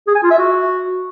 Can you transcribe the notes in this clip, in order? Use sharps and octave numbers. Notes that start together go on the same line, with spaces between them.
G#4
G#5
F4
E5
F#4